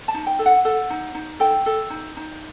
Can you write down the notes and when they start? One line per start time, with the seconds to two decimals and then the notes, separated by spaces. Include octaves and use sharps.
0.08 A5
0.14 D#4
0.27 G5
0.39 A4
0.46 F#5
0.65 A4 F#5
0.90 D#4
1.15 D#4
1.40 A4 G5
1.66 A4
1.90 D#4
2.17 D#4